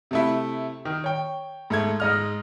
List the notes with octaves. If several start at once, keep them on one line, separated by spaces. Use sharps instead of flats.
C3 A3 E4
D#3
C#5 G5
G#2 A3 G#6
G#2 D#5 F6